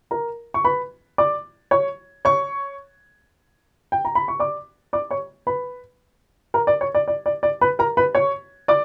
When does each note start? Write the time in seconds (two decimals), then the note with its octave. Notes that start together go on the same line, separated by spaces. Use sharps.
0.11 A#4 A#5
0.54 C#6
0.65 B4 B5
1.18 D5 D6
1.71 C#5 C#6
2.25 C#5 C#6
3.92 G5
4.05 A#5
4.15 B5
4.28 C#6
4.40 D5 D6
4.93 D5 D6
5.11 C#5 C#6
5.47 B4 B5
6.54 A#4 A#5
6.67 D5
6.81 C#5
6.95 D5
7.08 D5
7.26 D5
7.43 D5
7.61 B4 B5
7.79 A#4 A#5
7.97 B4 B5
8.15 C#5 C#6
8.68 D5 D6